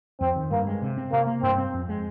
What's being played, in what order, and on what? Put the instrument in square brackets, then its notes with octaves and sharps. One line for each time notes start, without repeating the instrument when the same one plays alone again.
[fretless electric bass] F2 [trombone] C4
[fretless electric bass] D#3
[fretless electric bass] G2 [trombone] A#3
[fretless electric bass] G#3
C3
C4
[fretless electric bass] C3 [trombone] A#3
[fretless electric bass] A#3
[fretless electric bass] G2 [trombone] C4
[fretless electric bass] C4
F2
G#3